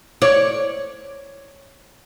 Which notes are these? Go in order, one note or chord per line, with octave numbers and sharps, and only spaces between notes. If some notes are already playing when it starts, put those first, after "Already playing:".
C#5 D5